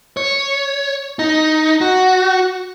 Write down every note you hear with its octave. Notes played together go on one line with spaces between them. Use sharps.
C#5
D#4
F#4